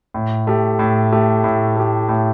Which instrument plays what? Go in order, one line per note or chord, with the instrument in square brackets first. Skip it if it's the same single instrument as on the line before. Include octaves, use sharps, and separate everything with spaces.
[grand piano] A2
A3 G4
A2
A3 G4
A2
A3 G4
A2